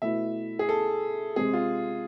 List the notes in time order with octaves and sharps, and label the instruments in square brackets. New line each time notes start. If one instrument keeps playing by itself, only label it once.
[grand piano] B2 A3 E4 [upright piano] E5
[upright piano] G#4
A4
[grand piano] C3 G#3 C4 [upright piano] G#4
[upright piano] F4